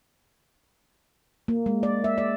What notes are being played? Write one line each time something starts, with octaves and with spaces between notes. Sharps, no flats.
A#3
G#3
D5
E5
D5